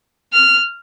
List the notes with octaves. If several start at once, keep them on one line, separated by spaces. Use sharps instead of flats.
F6